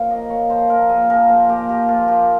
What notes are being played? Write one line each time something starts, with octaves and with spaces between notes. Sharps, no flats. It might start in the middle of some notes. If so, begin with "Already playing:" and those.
Already playing: A#2 F3 C#5 F5 G5
A#3 D#5
A#2 C#5
F3 C5
A#2 A#4
A#2 G#4
F3 A#4
A#2 C5
A#2 G4
F3 G4
A#2 F4
F3 G4